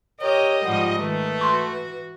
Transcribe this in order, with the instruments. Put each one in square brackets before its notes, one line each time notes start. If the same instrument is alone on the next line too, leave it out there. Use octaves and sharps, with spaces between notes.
[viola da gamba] G4 A#4 [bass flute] C#5 [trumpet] D#5
[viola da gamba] G#2 F3 G3 [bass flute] F#5
[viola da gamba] D#3 G#3 [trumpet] A3 [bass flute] B4
[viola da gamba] E3 F#4 [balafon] C6 C#6